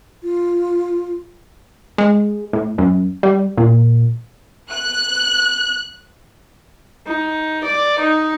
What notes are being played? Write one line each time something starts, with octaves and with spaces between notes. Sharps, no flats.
F4
G#3
A2
F#2
G3
A#2
F#6
D#4
D5
D#4